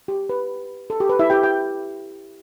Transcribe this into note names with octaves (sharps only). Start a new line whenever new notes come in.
G4
B4
A4
G4
B4
E4 E5
G4 G5
G5